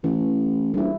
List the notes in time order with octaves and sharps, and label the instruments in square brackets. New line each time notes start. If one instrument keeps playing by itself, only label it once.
[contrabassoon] A1 [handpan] E3
[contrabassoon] A#1 [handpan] G3 E4